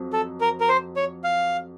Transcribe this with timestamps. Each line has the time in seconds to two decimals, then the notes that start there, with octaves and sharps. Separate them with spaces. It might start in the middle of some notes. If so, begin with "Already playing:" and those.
Already playing: F2 F#3
0.13 A4
0.41 A#4
0.60 A#4
0.69 C5
0.96 C#5
1.24 F5